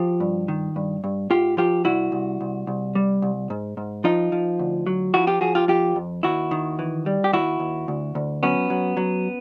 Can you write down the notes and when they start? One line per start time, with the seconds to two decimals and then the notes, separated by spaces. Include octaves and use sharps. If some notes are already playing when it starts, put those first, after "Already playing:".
Already playing: F3 F4 G4
0.20 G2
0.48 D#3
0.76 G2
1.04 G2
1.30 G#2 F4 G4
1.57 F3 F4 G4
1.85 C2 E4 F#4
2.12 C2
2.41 C2
2.67 C2
2.95 G3
3.22 C2
3.50 G#2
3.77 G#2
4.04 F3 D#4 F4
4.32 F3
4.59 D2
4.87 F#3
5.14 F3 E4 F#4
5.27 F4 G4
5.41 F3 F#4 G#4
5.55 F4 G4
5.68 F2 F4 G4
5.96 F2
6.23 D#2 E4 F#4
6.51 D#3
6.79 E3
7.06 G3
7.24 G4
7.33 D#2 E4 F#4
7.60 D#2
7.88 D2
8.15 D2
8.43 F#3 B3 C#4
8.70 F#3
8.97 F#3